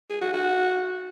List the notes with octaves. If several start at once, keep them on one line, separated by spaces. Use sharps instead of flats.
G#4
F#4
F#4